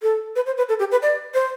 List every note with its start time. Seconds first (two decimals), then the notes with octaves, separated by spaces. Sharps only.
0.02 A4
0.36 B4
0.46 C5
0.58 B4
0.69 A4
0.79 G4
0.91 B4
1.02 D5
1.34 C5